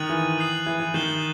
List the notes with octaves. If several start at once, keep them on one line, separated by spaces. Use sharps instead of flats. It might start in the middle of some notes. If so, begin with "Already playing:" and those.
Already playing: D#3 D#6 F#6 A6 D#7 F#7
E3
D#6 G6 C7 F#7
E3
E3
D#3 G6 C7 E7 G7